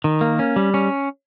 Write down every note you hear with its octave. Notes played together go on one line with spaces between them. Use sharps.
D#3
A#3
C#4
G3
C#4